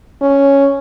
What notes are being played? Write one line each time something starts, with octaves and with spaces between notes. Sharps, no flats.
C#4